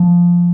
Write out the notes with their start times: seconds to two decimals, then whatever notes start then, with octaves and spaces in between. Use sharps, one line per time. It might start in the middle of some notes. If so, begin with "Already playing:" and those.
Already playing: F3